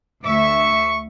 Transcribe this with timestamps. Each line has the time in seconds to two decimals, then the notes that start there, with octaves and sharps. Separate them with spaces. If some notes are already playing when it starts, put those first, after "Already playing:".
0.24 D2 E5 C#6